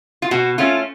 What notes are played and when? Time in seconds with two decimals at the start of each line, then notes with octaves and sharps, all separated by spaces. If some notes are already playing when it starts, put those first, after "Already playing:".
0.22 F4
0.31 B2 F#4
0.58 A3 C#4 F4